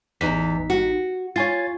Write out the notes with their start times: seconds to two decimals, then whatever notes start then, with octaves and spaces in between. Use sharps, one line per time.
0.21 A1 E2 D#4 B6
0.70 F#4
1.36 F4 C#5 G#5 A6